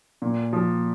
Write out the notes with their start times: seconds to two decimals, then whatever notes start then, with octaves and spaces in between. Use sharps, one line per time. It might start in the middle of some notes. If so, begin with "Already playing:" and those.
0.22 A#2
0.53 F3